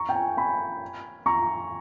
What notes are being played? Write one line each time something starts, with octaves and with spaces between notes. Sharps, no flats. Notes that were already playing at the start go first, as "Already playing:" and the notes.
Already playing: A#5 C#6
G5
G#5
G#5 B5
A#5 C#6